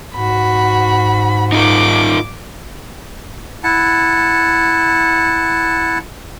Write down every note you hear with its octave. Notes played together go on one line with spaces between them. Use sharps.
G#2 F#4 B5
D#4 F4 A#4 D6
E4 F#5 A5